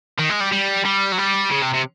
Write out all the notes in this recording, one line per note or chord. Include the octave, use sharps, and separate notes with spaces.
D#3
G#3
G3
G3
G3
F#3
G3
C#3
C3
C3